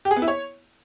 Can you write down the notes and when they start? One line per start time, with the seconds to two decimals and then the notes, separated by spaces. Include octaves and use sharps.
0.05 G4
0.11 G#4
0.16 B3
0.22 E4
0.28 C#5